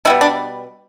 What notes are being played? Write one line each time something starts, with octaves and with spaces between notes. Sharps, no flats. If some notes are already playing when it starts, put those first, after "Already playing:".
B2 G3 B3 E4
D4